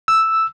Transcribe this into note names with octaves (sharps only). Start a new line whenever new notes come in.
E6